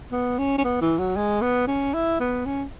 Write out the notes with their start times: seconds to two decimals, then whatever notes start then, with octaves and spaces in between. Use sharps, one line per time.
0.12 B3
0.38 C#4
0.58 C#4
0.64 B3
0.81 E3
0.98 F#3
1.17 G#3
1.42 B3
1.67 C#4
1.94 E4
2.20 B3
2.46 C#4